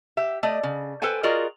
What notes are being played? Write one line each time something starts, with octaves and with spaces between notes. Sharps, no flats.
G4 E5
A3 D5 D#5
C#3
A4 B4 C5 G5 G#5
F4 F#4 G#4 A#4 D5 D#5